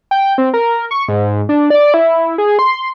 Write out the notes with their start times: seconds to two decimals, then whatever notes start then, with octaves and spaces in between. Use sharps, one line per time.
0.11 G5
0.38 C4
0.54 A#4
0.91 C#6
1.09 G#2
1.49 D4
1.70 D5
1.94 E4
2.38 G#4
2.59 C6